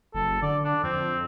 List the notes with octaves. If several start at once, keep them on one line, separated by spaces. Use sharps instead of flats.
F#1 A4
D3 D5
D4
F2 C4